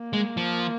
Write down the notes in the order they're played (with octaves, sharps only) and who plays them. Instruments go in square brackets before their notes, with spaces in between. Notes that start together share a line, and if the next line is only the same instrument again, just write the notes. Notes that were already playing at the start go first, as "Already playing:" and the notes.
Already playing: [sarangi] A#3
[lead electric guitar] G#3
F3